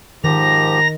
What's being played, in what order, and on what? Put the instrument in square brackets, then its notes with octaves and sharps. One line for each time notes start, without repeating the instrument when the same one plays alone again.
[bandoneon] G#2 F3 G4 [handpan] D#3 [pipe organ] A#5 A#6